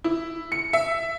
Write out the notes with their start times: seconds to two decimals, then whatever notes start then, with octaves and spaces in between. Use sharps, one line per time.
0.04 E4
0.52 C#7
0.73 E5